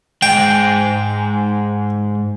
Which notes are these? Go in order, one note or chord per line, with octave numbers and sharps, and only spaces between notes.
G#2 G#3 G5